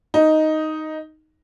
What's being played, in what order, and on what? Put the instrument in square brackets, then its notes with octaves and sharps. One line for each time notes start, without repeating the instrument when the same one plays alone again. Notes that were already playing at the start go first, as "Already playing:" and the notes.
[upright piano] D#4